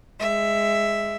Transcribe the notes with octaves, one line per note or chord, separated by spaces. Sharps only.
G#3 E5